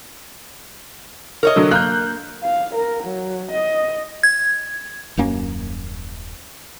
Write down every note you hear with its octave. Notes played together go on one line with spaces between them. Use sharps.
A#4 C#5 D#5
D3 F#3
A#3 F#6 G6
F5
A#4
F#3
D#5
G#6
D#1 F#2 A#3 C#4